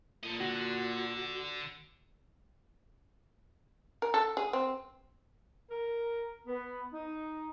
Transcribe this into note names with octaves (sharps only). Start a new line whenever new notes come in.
A#2 A4 D#5
D3 F#4
A#4
A4
G#4
C4
A#4
B3
D#4